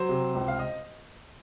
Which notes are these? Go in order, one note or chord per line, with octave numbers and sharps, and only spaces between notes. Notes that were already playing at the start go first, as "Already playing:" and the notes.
Already playing: F#3 C5
C3
C#2
F5
D#5